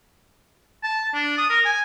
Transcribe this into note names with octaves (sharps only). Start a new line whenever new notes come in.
A5
D4
D#6
A#4
G#5